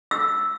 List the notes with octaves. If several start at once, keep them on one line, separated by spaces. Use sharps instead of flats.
E6